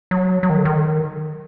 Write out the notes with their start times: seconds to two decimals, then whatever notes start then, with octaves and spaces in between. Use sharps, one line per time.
0.11 F#3
0.43 F#3
0.50 D#3
0.57 D3
0.65 D#3